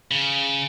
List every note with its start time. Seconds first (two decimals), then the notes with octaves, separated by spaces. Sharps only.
0.11 C#3